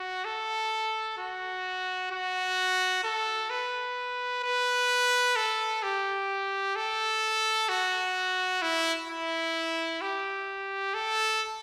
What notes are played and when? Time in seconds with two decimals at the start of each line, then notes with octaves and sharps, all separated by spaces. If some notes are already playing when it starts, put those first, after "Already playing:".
Already playing: F#4
0.25 A4
1.17 F#4
2.11 F#4
3.04 A4
3.50 B4
4.43 B4
5.36 A4
5.83 G4
6.76 A4
7.69 F#4
8.62 E4
9.08 E4
10.01 G4
10.94 A4